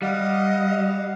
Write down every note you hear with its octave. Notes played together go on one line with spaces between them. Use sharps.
G3 D#5 F5 F#5